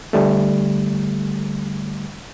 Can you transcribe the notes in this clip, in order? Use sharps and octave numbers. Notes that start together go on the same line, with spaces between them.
D3 G3 A3